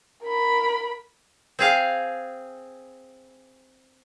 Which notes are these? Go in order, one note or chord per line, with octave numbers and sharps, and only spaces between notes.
A#4 B5
C4 G#4 F5